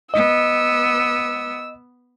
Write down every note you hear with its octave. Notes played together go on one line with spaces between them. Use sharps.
B3 D#5 E6